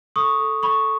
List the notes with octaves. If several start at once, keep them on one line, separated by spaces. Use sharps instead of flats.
A4 C#6 D#6
A4
A4 B5 C#6